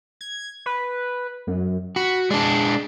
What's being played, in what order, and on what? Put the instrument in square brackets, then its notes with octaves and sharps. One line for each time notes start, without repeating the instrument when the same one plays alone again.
[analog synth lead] G#6
B4
F#2
[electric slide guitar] F#4 [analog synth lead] B5
[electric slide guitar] G#3 D4 [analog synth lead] D5